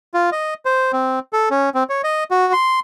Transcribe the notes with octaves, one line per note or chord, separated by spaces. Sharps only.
F4
D#5
C5
C4
A4
C#4
C4
C#5
D#5
F#4
C6